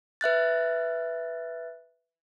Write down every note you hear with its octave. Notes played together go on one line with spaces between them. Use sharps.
B4 E5 F#6 A6